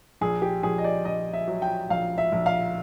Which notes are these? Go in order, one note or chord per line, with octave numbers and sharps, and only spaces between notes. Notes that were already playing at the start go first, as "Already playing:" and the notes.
A#1 G#4
G4
A#1 G#4
D#5
D5
A#1 D#5
E5
F#3
G5
A#1 F5
E5
A#1
F5